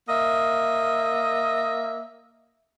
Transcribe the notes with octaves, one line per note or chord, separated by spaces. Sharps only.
A#3 D#5 E5